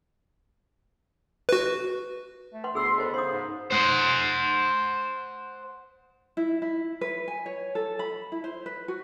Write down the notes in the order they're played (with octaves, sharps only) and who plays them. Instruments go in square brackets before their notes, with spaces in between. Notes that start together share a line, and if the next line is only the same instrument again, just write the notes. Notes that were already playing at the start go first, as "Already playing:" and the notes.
[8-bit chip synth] F#4 B4
[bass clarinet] A3
[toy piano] B4 F#5 C6
[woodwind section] D2 C6 [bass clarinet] B3 [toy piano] G#4 E6
[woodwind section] D#3 A4 [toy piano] F#4 C5
[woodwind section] C#3 C#4 C5 [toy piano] C6 D#6
[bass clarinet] G#2
[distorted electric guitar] C5 F#5
[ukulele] E4
E4
B4
G#5
C#5
A4
B5
E4
C5
B4
F#4